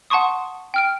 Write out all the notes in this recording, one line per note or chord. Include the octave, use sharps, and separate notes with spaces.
F#5 A5 C6 C#6 D#6
G5 F6 D7